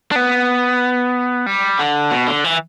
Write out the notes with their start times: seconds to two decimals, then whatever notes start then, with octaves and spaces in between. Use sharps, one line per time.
0.11 D4
0.16 B3
1.46 G3
1.79 D3
2.11 B2
2.28 D3
2.44 E3